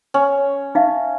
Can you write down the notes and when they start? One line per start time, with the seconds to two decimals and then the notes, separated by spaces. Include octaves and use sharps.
0.14 C#4
0.75 D#4 E5 F5